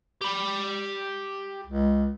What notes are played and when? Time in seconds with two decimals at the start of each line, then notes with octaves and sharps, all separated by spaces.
0.22 G4 B5
1.67 C#2